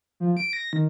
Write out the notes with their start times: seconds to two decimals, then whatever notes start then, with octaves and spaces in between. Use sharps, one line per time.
0.20 F3
0.37 D7
0.53 A#6
0.73 D#3